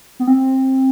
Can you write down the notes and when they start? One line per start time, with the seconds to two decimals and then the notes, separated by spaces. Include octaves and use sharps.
0.20 B3
0.27 C4